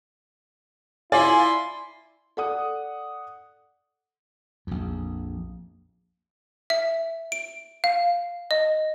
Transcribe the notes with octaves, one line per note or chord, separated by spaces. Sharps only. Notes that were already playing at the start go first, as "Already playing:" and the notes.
E4 F4 D5 G#5 C6
A4 D5 F#5 D#6
A#1 F2
E5
D7
F5
D#5